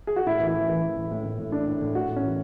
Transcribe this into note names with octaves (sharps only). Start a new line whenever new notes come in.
G#4
F#4
A2 E4
E3
E4
E3
E3
E3
A2
A2
A2
A2
A2 D4
A2
A2
A2 F#4
A2
C#4
E3